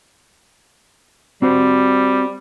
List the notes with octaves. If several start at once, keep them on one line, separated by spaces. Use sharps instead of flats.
G3 C4 F#4 C5